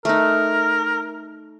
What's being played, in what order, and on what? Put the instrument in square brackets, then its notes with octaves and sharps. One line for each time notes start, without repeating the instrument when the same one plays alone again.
[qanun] A3 D#4 [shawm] A#4